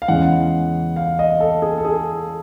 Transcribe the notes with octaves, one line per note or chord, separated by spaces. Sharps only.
F5
E2 C#3 E3 G#3 F#5
F5
D#5
A4
G#4
A4
G#4